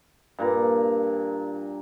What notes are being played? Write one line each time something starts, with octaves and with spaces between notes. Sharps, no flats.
G2 A#2 A#5